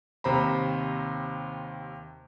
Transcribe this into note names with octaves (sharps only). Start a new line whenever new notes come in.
D#2 C3 C5 A#5 B5